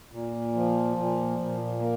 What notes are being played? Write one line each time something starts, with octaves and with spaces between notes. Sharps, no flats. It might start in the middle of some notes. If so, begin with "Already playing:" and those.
A#2
F3
A#2
A#2
A#3